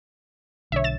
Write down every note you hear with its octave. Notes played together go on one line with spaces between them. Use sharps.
B1 D3 C#5 E5
A6 E7